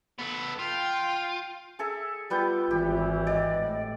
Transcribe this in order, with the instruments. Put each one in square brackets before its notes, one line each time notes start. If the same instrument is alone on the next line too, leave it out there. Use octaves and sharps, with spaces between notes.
[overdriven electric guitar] B3 A4
[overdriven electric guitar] F4 [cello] G5
[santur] G#4 A4 E5
[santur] G3 B3 G5 [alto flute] F4
[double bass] G#1 E3 [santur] G4
[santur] D5 [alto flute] D#5
[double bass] A2